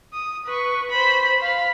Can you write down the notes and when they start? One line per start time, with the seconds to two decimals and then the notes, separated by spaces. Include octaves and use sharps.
0.13 D#6
0.45 B4 C#6
0.90 C5 B5
1.42 F5 B5